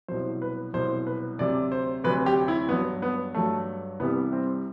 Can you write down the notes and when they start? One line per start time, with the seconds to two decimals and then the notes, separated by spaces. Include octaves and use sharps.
0.08 C2 B2 F#3 C5
0.42 B4
0.74 C2 B2 F#3 C5
1.07 B4
1.39 D2 C3 F#3 D5
1.72 C5
2.04 D2 C3 F#3 B4
2.26 G4
2.48 E4
2.69 G2 F#3 B3
3.02 B3
3.34 G2 F#3 A3
4.00 C2 C3 E3 G3 B3
4.33 C4